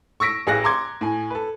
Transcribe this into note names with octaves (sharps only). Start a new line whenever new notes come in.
C#6 E6 A#6 B6 D7
A1 G#4 F5 F#6 A#6
A#5 C6 D6 G#6
A2 G#5
A4 B4